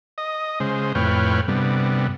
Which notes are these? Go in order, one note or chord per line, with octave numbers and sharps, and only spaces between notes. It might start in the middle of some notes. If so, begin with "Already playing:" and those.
D#5
C#3 G#3 C5
F2 A2 B4 C#5 G5 F6
G2 C3 G3 B3